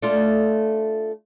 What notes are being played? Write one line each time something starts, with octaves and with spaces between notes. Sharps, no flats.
A3 D4 F4